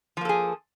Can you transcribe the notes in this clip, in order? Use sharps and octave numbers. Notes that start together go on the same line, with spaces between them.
F3 A#3 G#4 A4